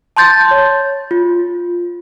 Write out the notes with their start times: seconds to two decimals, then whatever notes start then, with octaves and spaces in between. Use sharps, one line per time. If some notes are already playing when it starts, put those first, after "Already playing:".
0.17 A5 C6 G6 A6
0.51 C#5
1.11 F4